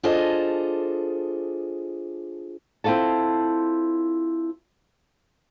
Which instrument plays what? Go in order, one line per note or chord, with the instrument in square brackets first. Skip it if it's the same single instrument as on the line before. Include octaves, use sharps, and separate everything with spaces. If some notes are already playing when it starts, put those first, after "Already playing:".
[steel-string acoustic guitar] D4 F4 G#4 A4 C5 D#5
[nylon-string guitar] C4 E4 F4 A4 A5